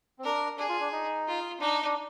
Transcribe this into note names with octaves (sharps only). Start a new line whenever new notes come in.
C4
D4 A#4
D4 G#4
F4
D4
D#4
F4
D4 D#4
D4